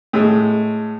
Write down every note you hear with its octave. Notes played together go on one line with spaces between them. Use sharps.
A2 G#3